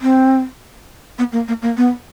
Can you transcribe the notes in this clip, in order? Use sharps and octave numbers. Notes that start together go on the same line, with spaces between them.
C4
B3
A#3
A#3
A#3
B3